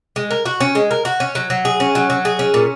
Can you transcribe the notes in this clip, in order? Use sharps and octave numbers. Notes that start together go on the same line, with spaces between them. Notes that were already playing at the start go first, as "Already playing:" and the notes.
G#3
A#4
F#4
C#4
G#3
A#4
F#4
C#4
F#3
F#3
G#4
C#4
F#3
F#3
G#4
C#4
A#2